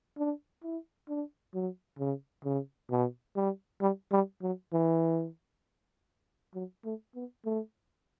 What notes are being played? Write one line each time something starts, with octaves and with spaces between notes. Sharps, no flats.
D4
E4
D4
F#3
C#3
C#3
B2
G3
G3
G3
F#3
E3
F#3
A3
B3
A3